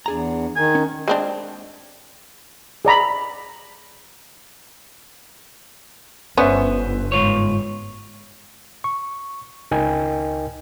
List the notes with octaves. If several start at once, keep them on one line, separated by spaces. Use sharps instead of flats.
E2 D4 G#4 A#5
D#3 G#5
C#4
G#3 C4 D4
G#4 D5 A#5 B5
G1 B3 C#4 B4 C5 E5
G#2 F4 C#5
C#6
C#2 D#4 A#4 D#5 G5 G#5